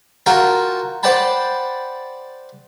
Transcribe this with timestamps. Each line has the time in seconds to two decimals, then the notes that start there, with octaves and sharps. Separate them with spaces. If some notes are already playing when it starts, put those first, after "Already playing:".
0.26 F4 F#4 A#4 G5 A5 A#5
1.03 C5 D5 F#5 G5 A5 B5